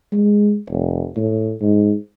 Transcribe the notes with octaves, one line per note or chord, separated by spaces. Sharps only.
G#3
F1
A2
G#2